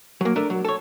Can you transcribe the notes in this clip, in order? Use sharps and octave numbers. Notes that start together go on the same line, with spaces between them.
F#3 A#3
A3 D4 A#4
F#3
A4 C#5